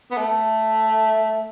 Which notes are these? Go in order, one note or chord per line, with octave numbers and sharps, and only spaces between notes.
B3
A3